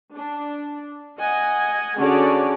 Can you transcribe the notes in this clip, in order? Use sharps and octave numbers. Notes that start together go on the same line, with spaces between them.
D4
D#5 F#5 G#5
D3 C#4 F#4 G#4 C#5 D5